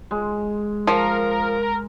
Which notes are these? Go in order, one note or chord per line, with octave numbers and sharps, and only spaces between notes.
G#3
F3 A#4